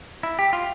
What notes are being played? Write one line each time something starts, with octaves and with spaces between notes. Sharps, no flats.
E4
G4
F4